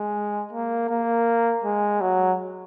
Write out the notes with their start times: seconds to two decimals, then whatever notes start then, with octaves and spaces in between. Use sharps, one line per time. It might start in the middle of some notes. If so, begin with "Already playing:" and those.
Already playing: G#3
0.53 A#3
0.90 A#3
1.64 G#3
2.01 F#3